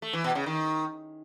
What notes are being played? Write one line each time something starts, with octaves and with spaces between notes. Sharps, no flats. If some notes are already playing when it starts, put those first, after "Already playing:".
A3
E3
B2
C#3
D#3